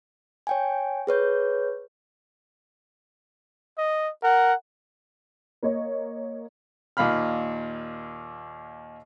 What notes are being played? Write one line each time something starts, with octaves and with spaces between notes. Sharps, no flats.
C#5 G5 G#5
G#4 B4 C#5 G6
D#5
A#4 F#5
A#3 C#5 D#5
D#2 A#2 F5 B5 F6